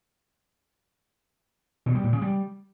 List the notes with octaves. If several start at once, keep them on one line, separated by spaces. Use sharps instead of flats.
B2
G3
A#2
C#3
G3